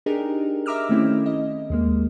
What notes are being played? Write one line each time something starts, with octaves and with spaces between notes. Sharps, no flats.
D4 D#4 G4 G#4 A#4
D#5 E5 A#5 D6 E6 F6
D#3 A3 C4 C#4 E4
D#5
D#2 G#3 A#3